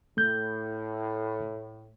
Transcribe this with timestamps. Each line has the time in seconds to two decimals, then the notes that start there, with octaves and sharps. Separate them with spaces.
0.17 A2 A3 G6